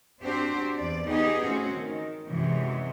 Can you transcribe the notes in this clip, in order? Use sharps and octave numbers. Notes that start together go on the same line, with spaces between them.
C4 D4 F#4 G4 C5
E2 D5
B3 D#4 G4 G#4
A2 C4 C#4 F#4
D#3
F#2 C3 E3 F#3 G#3